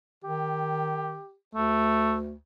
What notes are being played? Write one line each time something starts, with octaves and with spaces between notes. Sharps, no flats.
D#3 G4
D2 A3